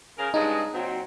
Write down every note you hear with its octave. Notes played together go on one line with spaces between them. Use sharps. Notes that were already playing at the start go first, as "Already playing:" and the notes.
C#3 A#4
G2 C#3 G#3 D#4
A#2 F#3 C4